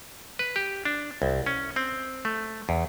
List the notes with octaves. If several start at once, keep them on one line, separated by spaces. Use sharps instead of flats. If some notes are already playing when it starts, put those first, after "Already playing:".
B4
G4
D4
C2
C#4
C4
A3
E2